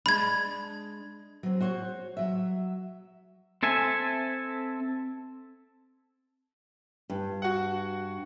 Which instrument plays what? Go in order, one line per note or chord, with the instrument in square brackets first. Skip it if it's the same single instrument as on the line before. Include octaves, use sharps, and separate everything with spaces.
[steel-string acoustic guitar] G#3 D4 [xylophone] B5 G#6
[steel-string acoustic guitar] F#3 C4
F#4 C5 C#5
F#3 E5
[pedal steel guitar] C4 A4 E5 G#5
[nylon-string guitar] G2
[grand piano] F#4 F#5